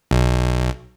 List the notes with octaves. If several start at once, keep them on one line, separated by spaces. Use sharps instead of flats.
B1